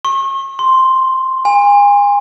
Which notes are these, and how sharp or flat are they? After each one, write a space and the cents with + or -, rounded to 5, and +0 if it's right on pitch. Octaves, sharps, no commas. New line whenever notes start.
C#6 -40
C6 +0
G#5 -35